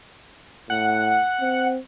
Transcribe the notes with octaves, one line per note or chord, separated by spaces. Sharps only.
A2 F#5
C4